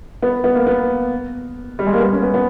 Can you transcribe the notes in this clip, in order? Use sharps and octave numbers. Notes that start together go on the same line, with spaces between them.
B3
B3
A#3
B3
G3
G#3
A#3
B3
C#4
B3
B3